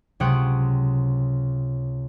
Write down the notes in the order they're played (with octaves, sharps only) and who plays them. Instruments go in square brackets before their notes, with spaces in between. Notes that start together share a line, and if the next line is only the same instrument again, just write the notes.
[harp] C#2 C3 F#3 F#5 G5 D#6